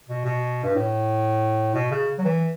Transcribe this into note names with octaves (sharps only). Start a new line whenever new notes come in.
B2
B2
G2
A2
B2
C#3
F#3
E3